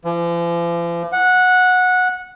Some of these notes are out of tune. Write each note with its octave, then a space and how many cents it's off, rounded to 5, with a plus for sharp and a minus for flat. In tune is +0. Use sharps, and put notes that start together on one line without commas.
F3 -45
F#5 -15